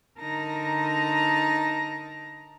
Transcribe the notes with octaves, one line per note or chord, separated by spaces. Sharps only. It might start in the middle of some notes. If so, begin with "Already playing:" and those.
D3 D#4 A#4 A5 A#5 A#6